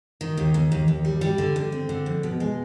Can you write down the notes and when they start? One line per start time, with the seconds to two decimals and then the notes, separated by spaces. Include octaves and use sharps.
0.21 D#3
0.37 D#2
0.54 D#2
0.72 D#2
0.88 D#2
1.05 G3
1.21 G3
1.38 D3
1.56 D3
1.72 C4
1.89 D3
2.06 F2
2.23 B2
2.40 G#3